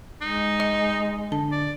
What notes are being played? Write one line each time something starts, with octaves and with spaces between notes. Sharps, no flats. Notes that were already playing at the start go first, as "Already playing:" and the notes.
G#3 D#4
D#5
D3 A5
D5